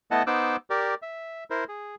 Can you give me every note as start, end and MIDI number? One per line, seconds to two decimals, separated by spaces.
0.11 0.23 57
0.11 0.23 59
0.11 0.23 64
0.11 0.23 75
0.11 0.23 78
0.11 0.23 81
0.27 0.56 59
0.27 0.56 63
0.27 0.56 72
0.27 0.56 86
0.27 0.56 88
0.27 0.56 90
0.70 0.94 67
0.70 0.94 70
0.70 0.94 74
1.02 1.44 76
1.50 1.64 64
1.50 1.64 70
1.50 1.64 72
1.69 1.95 68